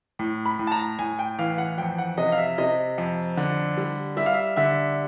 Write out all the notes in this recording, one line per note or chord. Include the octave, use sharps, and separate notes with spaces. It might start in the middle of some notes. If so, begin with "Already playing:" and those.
A2
B5
A2
A5
A#5
A2 G#5
G5
E3 F5
F#5
F2 G5
F#5
C3 D#5
F5
E5
C3 D#5
F2
D3
G3
G3 E5
F5
E5
D3 E5